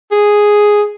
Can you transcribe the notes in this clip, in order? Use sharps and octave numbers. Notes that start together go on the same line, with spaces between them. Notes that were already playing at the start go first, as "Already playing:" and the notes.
G#4